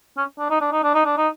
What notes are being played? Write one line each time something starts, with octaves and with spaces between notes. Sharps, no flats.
C#4
D4
D#4
D4
D#4
D4
D#4
D4
D#4